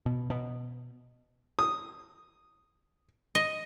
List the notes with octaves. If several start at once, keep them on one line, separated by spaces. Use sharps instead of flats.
B2
B2
D#6
D#5